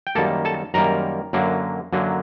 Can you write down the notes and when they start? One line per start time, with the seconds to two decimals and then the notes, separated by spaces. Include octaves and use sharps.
0.07 G5
0.15 F#2 D#3 G3 A#3 A4 A5
0.45 A4 A5
0.74 F#2 D#3 G3 A#3 A#4 A#5
1.33 F#2 D3 F#3 A#3
1.93 F#2 D3 F#3 A#3